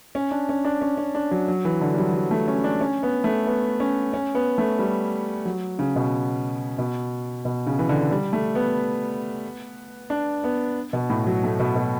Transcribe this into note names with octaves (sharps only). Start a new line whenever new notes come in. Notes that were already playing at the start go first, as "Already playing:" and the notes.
C#4
D4
C#4
D4
C#4
C#4
D4
F#3
F#3
E3
D3
G3
F#3
F#3
A3
C#4
D4
C#4
B3
A3
B3
C#4
C#4
B3
A3
G3
F#3
C#3
B2
B2
B2
C#3
E3
D3
G3
A3
B3
D4
B3
B2
A2
F#3
A3
B2
B2